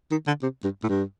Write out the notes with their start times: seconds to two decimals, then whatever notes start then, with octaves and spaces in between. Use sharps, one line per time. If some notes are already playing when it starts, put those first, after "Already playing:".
0.11 D#3
0.27 D3
0.43 C3
0.64 G2
0.84 A2
0.89 G2